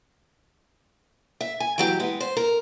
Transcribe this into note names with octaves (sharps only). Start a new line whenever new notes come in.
E5
G#5
E3 F#3 G4
G#3 B3
C5
A#4